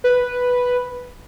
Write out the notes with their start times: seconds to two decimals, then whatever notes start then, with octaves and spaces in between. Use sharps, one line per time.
0.04 B4